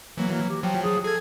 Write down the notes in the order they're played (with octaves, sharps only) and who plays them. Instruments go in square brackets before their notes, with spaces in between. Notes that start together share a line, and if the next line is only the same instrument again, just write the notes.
[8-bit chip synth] E3 F#3 [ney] A#3
[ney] A#3
G4
[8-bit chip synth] F3 F#3 [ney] G5
[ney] G#4
[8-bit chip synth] G#4 G#6 [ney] A4